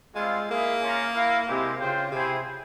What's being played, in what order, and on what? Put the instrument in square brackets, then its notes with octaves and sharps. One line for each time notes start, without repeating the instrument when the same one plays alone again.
[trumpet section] G3 C4 F4 [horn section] G#3
[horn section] A#3 [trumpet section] E4 G#4 E5
[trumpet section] C#4 F4 A#4
E4 A#4 F5
[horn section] C3 [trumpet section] G#3 C4 E4 G4
[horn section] C#3 [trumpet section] F4 C5 G5
[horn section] C3 [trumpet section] E4 G#4 C5 G5